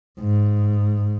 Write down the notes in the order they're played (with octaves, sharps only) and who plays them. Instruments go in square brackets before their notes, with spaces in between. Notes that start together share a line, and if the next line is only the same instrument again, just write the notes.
[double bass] G#2